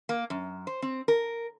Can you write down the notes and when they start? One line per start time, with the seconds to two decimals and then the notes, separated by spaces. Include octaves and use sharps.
0.09 A#3
0.30 F#2
0.67 C5
0.82 C4
1.08 A#4